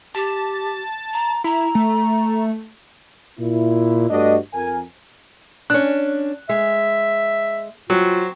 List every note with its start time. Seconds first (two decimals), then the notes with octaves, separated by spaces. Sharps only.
0.15 G4 A5
1.13 A#5
1.44 E4 A#5
1.75 A3
3.39 A#2 E4
4.08 G2 A3 D4 F#4 D#5
4.53 F2 A#4 G#5
5.70 C#4 D4 F#6
6.49 G#3 E5
7.90 F#3 C4 F4